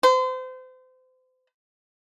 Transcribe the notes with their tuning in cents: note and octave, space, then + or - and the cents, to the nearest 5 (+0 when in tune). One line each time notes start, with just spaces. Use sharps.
C5 -35